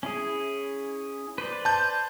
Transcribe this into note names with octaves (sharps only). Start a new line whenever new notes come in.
C#4 E4 G#4
B4 C5 D5
A5 G6